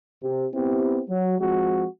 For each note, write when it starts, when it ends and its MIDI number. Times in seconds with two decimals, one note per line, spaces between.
0.23 0.46 48
0.54 1.01 59
0.54 1.01 60
0.54 1.01 64
0.54 1.01 67
1.09 1.39 54
1.40 1.86 53
1.40 1.86 56
1.40 1.86 60
1.40 1.86 66